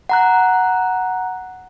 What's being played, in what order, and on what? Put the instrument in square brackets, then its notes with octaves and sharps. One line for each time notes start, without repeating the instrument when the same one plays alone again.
[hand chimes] F#5 A#5 F#6